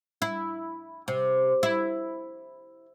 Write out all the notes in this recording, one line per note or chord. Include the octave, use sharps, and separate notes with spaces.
E4
C3
E4